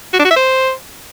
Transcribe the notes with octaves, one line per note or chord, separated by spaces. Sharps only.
F#4
D4
F#4
E5
C5